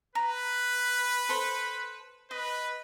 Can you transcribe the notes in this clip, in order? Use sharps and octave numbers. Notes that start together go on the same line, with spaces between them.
B4 A#5
A4 C5
B4 D#5